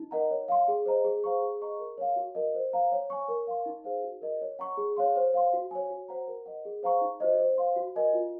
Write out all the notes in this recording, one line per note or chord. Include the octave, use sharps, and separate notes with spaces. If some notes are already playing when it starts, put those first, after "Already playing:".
Already playing: D#4
A#4 D#5 F#5 A#5
C#5
F5 C6
G#4
C5 D#5 A#5
G#4
C5 F5 A#5 C#6
G#4
D#5 A#5 C#6
A#4
C#5 F5
F#4
A#4 D#5
C5
F5 A#5
C#5
G#5 C#6
A#4
F5 C6
D#4
G#4 C5 F5
F#4
A#4 D#5
C#5
F#5 A#5 C#6
G#4
C#5 F5 C6
C5
F5 C6
F#4
C#5 G#5
F#4
C5 F#5 A#5
A#4
D#5 F#5
G#4
C5 F5 A#5 C#6
D#4
F#4 C5 D#5
C5
F5 C6
F#4
A#4 D#5 G#5
F4